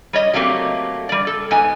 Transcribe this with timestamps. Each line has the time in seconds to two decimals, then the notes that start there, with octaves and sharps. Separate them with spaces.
0.13 G3 C#5 D#5
0.34 F#3 A3 A#3 C4 G4
1.09 G3 D5
1.27 A4
1.51 G#2 B3 G#5